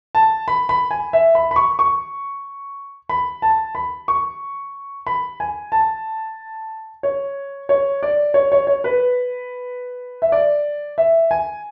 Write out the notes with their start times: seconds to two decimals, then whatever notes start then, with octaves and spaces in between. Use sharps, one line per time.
0.15 A5
0.48 B5
0.69 B5
0.91 G#5
1.13 E5
1.35 B5
1.51 B5
1.56 C#6
1.79 C#6
3.09 B5
3.42 A5
3.75 B5
4.08 C#6
5.07 B5
5.40 G#5
5.72 A5
7.03 C#5
7.69 C#5
8.03 D5
8.34 C#5
8.52 C#5
8.67 C#5
8.84 B4
10.22 E5
10.32 D5
10.98 E5
11.31 G#5